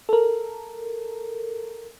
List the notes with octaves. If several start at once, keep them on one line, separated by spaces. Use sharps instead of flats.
A4 A#4